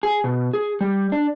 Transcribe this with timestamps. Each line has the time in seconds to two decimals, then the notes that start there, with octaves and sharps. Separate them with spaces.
0.03 G#4
0.24 B2
0.53 G#4
0.81 G3
1.12 D4